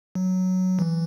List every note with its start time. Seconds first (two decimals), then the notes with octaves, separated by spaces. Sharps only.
0.15 F#3
0.79 E3